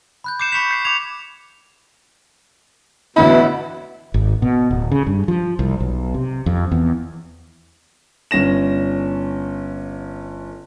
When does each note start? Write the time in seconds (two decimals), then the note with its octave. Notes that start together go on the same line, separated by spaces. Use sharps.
0.24 B5 F#6 G6
0.39 D6 G6 C7 C#7 E7
0.52 B5 C#6 B6 C#7 F7
0.71 G6 C7 E7
0.85 D6 G#6 F7
3.16 A1 B2 D3 E4 B5
4.14 G#1
4.42 B2
4.71 D1
4.91 C#3
5.07 G2
5.28 F3
5.59 C2
5.80 B1
6.14 C3
6.46 F2
6.72 E2
8.31 G1 C#4 A#6 E7